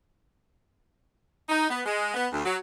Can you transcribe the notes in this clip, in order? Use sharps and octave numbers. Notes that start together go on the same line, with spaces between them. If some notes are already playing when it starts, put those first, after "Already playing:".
D#4
B3
G#3
B3
D2
F#3